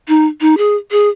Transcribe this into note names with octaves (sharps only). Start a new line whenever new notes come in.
D#4
D#4
G#4
G#4